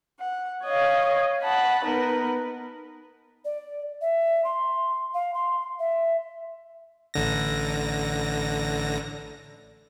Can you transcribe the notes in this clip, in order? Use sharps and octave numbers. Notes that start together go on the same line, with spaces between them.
F#5
C#5 D#5 F5
F#5 A5 B5
B3 D#4 A#4 B4
D5
E5
C6
F5
C6
E5
A1 D3 A#6